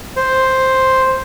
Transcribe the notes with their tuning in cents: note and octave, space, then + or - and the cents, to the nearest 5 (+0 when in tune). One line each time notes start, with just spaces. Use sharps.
C5 +0